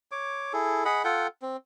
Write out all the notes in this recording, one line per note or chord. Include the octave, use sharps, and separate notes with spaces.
C#5 D6
E4 G#4 A4
G#4 D#5 F#5 B5
F4 A4 F#5 G5
C4